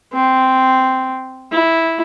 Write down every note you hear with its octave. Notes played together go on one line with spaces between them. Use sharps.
C4
E4